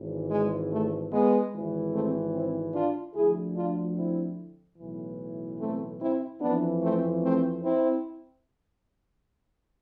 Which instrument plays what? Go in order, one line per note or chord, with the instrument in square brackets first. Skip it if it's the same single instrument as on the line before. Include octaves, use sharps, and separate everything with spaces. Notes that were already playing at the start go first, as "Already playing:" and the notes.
Already playing: [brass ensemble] G#1 G#2 E3
G#3
A3
G#3 B3
G#1 G#2 E3
A3 C4
C4 E4
D4 F4
D2 D3 F3 E4 G#4
D4 F4
C4 E4
B1 A2 E3
A3 C4
C4 E4
F2 E3 B3 D4
A3 C4
A3 C4
C4 E4